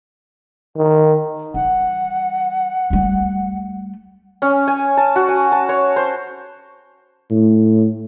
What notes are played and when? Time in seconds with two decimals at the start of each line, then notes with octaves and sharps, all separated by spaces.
0.77 D#3
1.54 E3 G3 F#5
2.90 G3 A3
4.42 C#4
4.68 G#5
4.97 A5
5.16 F#4
5.28 G#5
5.52 A5
5.69 C#5
5.96 C5
7.31 A2